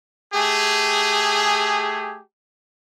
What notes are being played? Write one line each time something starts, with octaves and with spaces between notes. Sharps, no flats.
A3 G4 G#4